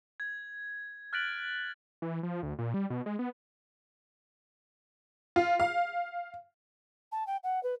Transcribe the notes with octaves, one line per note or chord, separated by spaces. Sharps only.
G#6
F6 F#6 A6 B6 D7 F#7
E3
F3
D2
A#2
G3
B2
G#3
B3
F4
F5
A5
G5
F#5
B4